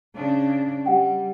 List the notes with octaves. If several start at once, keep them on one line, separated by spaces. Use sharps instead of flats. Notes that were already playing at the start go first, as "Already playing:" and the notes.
C#3 D4
G3 G4 F#5 G5